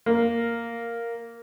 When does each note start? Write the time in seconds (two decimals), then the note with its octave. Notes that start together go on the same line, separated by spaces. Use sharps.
0.06 A#3